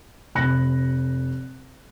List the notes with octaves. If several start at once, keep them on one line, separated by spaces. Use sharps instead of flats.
F1 B5 F#6 A#6 C#7